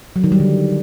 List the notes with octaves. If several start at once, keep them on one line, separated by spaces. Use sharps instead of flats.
F#3
D#3
G3
D3